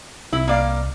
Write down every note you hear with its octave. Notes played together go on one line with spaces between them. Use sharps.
C2 E4
A#3 D5 F5